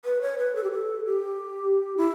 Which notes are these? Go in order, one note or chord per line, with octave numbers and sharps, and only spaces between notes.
B4
C#5
B4
A4
G4
A4
G4
E4